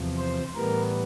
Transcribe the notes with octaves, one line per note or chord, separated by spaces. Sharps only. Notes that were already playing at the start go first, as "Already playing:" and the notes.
Already playing: E2 C3 F3
C5
A2 E3 G3 B3 A#4